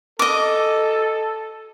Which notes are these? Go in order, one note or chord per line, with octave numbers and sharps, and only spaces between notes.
A4 D#5 D6